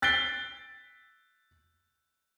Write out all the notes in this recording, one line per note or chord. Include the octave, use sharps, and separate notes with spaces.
F#6 A6 B6 C7 D7 G7